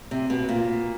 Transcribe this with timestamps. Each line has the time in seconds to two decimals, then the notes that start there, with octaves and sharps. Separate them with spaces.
0.11 C3
0.30 B2
0.49 A#2